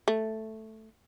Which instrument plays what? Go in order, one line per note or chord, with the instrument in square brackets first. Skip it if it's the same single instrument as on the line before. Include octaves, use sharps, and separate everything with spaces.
[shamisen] A3